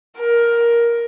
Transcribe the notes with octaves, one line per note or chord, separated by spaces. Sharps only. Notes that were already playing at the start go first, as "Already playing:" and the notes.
A#4